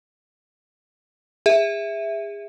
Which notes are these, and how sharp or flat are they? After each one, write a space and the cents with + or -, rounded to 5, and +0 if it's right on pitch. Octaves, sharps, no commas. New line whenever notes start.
G#4 -30 E5 +0